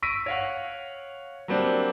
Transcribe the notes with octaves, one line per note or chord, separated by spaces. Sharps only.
C#6 E6 A#6 B6 D7 D#7
C#5 F5 F#5
F#3 G3 A#3 C4 D4